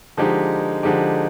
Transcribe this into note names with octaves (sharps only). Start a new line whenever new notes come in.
D3 F3 G#3 D#4 G4
D3 F3 G#3 D#4 G4